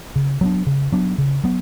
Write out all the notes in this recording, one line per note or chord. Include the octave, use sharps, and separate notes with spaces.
C#3
F#3 B3 D4
C#3
F#3 B3 D4
C#3
F#3 B3